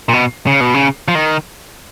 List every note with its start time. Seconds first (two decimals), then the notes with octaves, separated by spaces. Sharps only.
0.09 A#2
0.13 B2
0.47 C#3
0.61 B2
0.74 C#3
1.08 F3
1.15 D#3